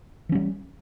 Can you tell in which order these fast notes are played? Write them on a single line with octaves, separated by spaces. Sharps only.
E3 C#4 G3